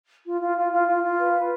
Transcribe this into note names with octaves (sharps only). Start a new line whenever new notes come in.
F4
F4
F4
F4
F4
F4
B4
B4